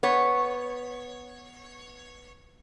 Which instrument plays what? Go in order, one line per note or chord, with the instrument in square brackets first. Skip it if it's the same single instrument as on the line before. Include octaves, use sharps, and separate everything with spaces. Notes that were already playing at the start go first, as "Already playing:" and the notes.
[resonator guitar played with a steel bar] B3 C#5